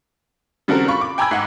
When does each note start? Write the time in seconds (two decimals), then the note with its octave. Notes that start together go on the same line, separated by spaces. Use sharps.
0.68 C#3 G3 C4 F#4 A4 A#4
0.88 F4 B5 C#6
1.01 D6
1.18 G5 G#5 A#5 B5 E6 G#6
1.31 G#2 F#5